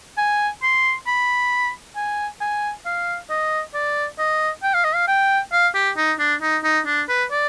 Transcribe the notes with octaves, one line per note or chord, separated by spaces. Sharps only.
G#5
C6
B5
G#5
G#5
F5
D#5
D5
D#5
G5
F5
D#5
F5
G5
F5
G4
D#4
D4
D#4
D#4
D4
B4
D5